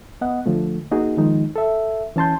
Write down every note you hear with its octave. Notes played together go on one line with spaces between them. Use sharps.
B3 D#5 F#5
D3 F3 A3
A#3 D#4 F#4 G#4
D#3 F3 G#3 D#4
A4 E5
E3 C#4 A5 C6 G6